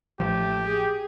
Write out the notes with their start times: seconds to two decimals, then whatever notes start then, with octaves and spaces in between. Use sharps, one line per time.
0.20 A1 F3 A3 G4
0.67 G#4